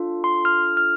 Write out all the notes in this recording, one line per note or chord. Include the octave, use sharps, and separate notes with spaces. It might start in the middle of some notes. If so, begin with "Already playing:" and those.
Already playing: D4 F4 A4
C6
F6
F6